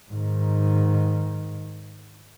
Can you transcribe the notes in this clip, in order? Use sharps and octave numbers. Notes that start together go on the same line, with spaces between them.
G#2 D#3